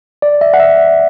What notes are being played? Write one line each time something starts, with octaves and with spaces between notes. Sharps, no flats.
D5
E5
F#5
E5